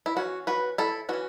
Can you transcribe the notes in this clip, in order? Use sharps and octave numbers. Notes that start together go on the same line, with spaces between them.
E4
E3 C#4 F#4
F#4 B4
E4 A4
E3 C#4 F#4